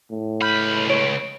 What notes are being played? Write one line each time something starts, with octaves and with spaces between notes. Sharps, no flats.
A2
C#2 B5 F6 G6
C#5 D7